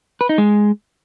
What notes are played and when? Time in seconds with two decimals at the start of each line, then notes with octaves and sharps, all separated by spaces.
0.21 B4
0.29 D#4
0.38 G#3